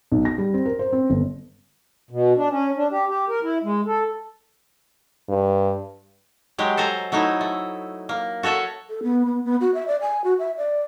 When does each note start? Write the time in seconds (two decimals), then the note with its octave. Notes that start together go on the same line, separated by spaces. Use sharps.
0.12 B1
0.25 A#6
0.38 G3
0.54 C4
0.66 A#4
0.79 C5
0.92 C4
1.10 G1
2.11 B2
2.37 D4
2.51 C#4
2.77 D4
2.91 G4
3.08 G4
3.29 A#4
3.43 E4
3.63 G#3
3.87 A4
5.29 G2
6.58 F#3 G#3 G4
6.77 A4 C5 G#5 A#5
7.12 F#3 A3 D#4 E4
7.41 A3
8.09 A#3
8.43 F#4 A4 C#5 E5
8.89 A4
9.03 B3
9.26 B3
9.45 B3
9.61 F#4
9.74 E5
9.88 D5
10.01 G#5
10.24 F#4
10.39 E5
10.58 D5